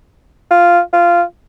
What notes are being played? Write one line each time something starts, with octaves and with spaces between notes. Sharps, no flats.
F4
F4